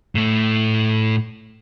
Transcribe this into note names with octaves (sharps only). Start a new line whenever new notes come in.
A2 A3